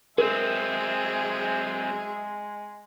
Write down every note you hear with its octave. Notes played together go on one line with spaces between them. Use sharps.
F#3 G#3 C4 G#4 A#4 E5